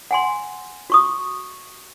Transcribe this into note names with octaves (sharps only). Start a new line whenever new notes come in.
F#5 G#5 C6
F#4 C#6 D#6